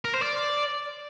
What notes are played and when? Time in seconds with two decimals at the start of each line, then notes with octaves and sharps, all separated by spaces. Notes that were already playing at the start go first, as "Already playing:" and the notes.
0.05 A#4
0.14 C5
0.22 D5